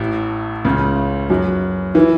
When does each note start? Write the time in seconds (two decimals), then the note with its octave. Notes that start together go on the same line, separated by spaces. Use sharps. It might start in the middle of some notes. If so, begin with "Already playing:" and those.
Already playing: A1 A2
0.65 C#2 C#3
1.30 F#2 F#3
1.95 E3